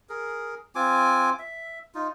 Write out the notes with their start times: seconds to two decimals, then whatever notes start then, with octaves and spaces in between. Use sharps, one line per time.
0.09 G#4 A#4
0.75 C4 F4 G#5 D6
1.39 E5
1.95 D#4 F4